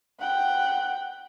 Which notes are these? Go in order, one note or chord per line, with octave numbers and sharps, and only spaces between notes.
F#5 G5